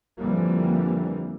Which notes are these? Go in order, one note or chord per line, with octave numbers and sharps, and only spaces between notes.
F2 D3 E3 G3 A#3